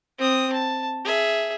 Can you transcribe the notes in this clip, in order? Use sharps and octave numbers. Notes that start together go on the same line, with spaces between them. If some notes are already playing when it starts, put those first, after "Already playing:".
C4 D#6
A5
G#4 E5